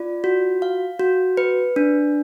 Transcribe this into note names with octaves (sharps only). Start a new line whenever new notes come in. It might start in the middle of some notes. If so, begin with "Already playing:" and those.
Already playing: F4 D5
F#4
F5
F#4
B4
D4